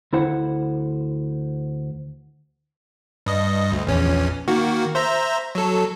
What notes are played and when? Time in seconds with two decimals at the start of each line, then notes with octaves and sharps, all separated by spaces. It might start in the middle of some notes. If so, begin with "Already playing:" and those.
0.13 D2 E4 C5 F#5
3.26 G2 D#5
3.72 D2
3.87 A#1 E2 C#4
4.48 D#3 A#3 F#4
4.95 C5 E5 A#5
5.55 F#3 A4